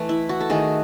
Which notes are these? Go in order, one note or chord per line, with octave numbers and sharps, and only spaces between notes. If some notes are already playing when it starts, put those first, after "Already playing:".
Already playing: E3 A3
E4
F#4
A4
D#3 A3 G#4